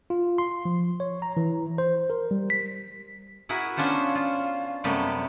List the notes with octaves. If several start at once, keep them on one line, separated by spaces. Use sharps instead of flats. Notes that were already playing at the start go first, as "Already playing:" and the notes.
F4
C6
F3
C#5
A#5
E3
C5
A#4
G3
B6
E4 F#4 G#4 A#4 B4
B3 C#4 D4 F4 C5 C#5
F4
F#2 C3 G3 A3 B3